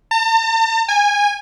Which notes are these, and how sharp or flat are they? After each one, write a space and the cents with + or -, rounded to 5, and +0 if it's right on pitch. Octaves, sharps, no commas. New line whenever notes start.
A5 +45
G#5 -20